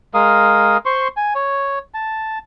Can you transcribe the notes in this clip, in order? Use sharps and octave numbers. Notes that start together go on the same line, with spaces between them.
G#3 A#4 F5 D#6
C5 C6 C#6
G#5
C#5
A5